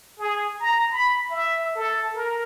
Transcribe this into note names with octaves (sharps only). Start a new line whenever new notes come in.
G#4
A#5
B5
E5
A4
A#4